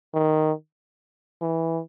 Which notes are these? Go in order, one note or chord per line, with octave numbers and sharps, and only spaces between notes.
D#3
E3